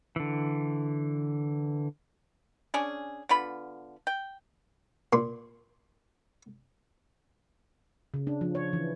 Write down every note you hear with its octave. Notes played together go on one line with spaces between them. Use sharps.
D3 E3
C#4 D4 G#4
D3 B3 F4 B5
G5
A#2 C6
C#3
D4
F3
C#5
E3